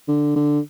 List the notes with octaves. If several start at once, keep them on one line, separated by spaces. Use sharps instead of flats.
D3
D3